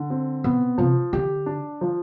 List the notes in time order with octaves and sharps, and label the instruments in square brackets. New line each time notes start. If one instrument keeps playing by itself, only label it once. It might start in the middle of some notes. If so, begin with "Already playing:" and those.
Already playing: [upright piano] D3
C4
[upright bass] B2 [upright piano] B3
[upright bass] C3 [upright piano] F3
[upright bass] D3 [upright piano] G4
[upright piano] D4
F3